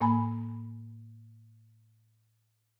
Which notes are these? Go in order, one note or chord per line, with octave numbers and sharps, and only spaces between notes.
A2 A#3 G#5 B5